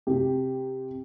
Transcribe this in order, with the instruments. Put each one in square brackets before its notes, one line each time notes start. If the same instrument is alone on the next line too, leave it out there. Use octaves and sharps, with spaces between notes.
[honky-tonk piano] C3 G4